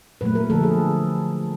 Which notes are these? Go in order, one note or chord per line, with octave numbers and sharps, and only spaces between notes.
A#2 F#3 A3 B4
A#4
D3 F3 A3 A4
G#4